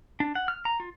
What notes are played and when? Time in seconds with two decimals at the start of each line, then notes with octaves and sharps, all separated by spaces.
0.20 D4
0.35 F#5
0.48 F6
0.65 A#5
0.80 F4